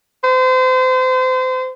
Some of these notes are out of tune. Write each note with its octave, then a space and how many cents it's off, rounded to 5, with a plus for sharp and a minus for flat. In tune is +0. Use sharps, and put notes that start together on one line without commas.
C5 -30